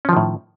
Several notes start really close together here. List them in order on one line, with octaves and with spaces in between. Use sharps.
C#4 F3 D#3 A2